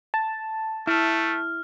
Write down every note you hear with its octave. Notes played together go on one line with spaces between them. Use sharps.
A5
A3 E4 F6